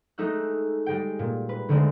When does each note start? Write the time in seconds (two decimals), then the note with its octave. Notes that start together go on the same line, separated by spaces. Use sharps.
0.18 G#3 A3 D#4 E6 F#6
0.86 G3 G#3 G5
1.19 A#2
1.49 B4
1.69 D3 D#3 G#3 A3 C4